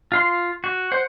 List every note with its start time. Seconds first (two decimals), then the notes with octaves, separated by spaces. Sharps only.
0.12 F4 F5 C6
0.64 F#4
0.92 C5 F#5